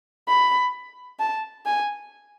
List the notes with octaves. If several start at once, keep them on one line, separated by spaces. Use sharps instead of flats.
B5
A5
G#5